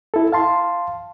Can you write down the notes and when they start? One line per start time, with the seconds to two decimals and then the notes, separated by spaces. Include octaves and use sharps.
0.14 E4 A4
0.33 F5 A5 C6